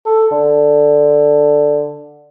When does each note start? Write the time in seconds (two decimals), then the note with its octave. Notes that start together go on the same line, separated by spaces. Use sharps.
0.05 A4
0.32 D3